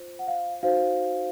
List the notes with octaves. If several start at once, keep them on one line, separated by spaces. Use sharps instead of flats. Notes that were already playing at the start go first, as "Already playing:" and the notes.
Already playing: F4 C5
F#5
F5
D#4 F#4 C5 F5